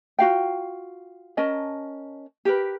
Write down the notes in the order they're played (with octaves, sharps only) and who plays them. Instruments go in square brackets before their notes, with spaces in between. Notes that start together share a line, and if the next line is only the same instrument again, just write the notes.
[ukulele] F4 F#4 F5 G5
C#4 A#4 D#5 A5
G4 A#4 B4